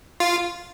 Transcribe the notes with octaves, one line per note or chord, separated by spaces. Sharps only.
F4